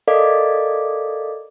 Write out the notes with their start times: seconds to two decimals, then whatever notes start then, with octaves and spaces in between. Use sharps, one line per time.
0.08 A4 A#4 D5 D#5 F5 D6